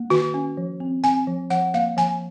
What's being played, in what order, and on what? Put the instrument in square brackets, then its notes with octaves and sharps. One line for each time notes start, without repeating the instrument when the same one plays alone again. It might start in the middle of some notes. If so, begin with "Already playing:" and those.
Already playing: [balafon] A#3
D#3 F#4
C#4
F3
C4
C4 G#5
F3
F3 F#5
A#3 F5
F3 G#5